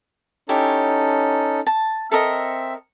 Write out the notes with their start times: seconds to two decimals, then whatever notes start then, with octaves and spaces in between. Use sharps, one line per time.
0.49 C#4 D#4 E4 G4 A4 C#5
1.67 A5
2.11 C4 A4 A#4 D#5 E5